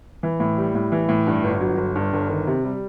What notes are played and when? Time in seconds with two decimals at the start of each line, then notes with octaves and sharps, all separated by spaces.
0.23 E3
0.40 A2
0.57 G3
0.75 A2
0.92 E3
1.09 A2
1.27 G2
1.44 G1
1.60 F#3
1.77 G1
1.95 G2
2.13 G1
2.29 D#3
2.47 C3
2.64 G3